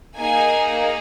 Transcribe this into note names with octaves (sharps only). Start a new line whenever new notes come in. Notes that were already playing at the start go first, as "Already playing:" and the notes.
A#3 D#4 G#4 G#5